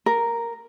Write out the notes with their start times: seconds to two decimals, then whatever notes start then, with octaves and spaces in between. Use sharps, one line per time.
0.06 A#4